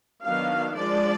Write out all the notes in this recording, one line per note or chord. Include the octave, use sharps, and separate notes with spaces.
D#3 F#3 B3 D4 F5
F3 G#3 D4 D5